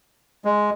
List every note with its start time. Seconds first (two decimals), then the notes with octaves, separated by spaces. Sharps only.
0.45 G#3